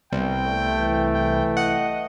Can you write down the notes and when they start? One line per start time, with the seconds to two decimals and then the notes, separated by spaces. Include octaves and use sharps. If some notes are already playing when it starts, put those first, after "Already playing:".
0.12 C2 B3 G5
0.47 A3
0.79 E3
1.14 G5
1.57 D#5 F#5